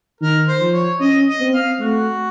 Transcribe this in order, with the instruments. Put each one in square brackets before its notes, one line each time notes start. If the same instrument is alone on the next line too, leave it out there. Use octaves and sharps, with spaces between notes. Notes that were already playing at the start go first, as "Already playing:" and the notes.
[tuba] D#3 [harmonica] A#4
[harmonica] C5
[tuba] F3
[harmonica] C#5
[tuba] C#4 [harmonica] D#5
[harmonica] D#5
[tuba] C4
[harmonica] F5
[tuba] A3 [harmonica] F#4